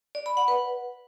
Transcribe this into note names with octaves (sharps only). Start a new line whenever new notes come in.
D5
B5
F#5
B4